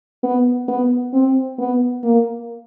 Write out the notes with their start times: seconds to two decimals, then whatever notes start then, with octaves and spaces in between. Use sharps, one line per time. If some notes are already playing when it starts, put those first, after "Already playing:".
0.23 B3
0.68 B3
1.13 C4
1.58 B3
2.03 A#3